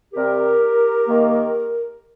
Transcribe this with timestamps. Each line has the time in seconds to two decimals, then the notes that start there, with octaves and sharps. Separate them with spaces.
0.13 C3 G3 C4 G4 A#4
1.08 D#3 A#3